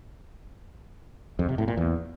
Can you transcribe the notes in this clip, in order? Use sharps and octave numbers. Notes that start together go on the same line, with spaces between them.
F2
C3
A2
A#2
E2